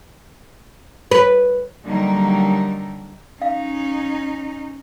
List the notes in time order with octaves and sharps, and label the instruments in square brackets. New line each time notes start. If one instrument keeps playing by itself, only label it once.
[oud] B4
[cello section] D3 F#3 G3 A#3 D#4
[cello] C#4 D#4 [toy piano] F5